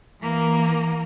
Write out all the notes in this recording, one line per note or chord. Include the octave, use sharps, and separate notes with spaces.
E3 A#3